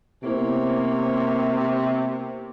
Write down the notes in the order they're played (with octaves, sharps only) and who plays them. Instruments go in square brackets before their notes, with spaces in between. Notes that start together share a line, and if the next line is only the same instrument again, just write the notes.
[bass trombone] C3 [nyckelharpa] A#3 C#5 [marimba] B3 E4 C5